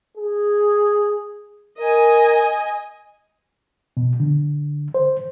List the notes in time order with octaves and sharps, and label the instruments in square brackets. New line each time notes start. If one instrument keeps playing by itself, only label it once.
[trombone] G#4
[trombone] A#4 [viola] D#5 G#5
[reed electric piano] B2
D3
C5